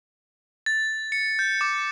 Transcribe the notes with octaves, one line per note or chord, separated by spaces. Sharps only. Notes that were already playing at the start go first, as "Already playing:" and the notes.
A6
C#7
G6
D6